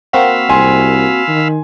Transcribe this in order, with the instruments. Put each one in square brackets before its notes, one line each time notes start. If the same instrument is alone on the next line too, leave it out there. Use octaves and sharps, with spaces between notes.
[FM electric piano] A#3 C4 F#4 [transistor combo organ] F5 B5 E6
[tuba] C2 [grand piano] G#5 C6
[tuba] D#3